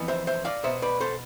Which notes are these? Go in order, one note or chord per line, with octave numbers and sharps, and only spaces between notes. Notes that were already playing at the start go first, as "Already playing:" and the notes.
Already playing: F2 E3 B3
C5 E5
C5 E5
D5 F5
B2 B3 C5 E5
B4 D5
A4 C5